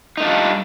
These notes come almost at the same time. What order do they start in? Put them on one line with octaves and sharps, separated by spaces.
D#4 A3 D4 F4 G3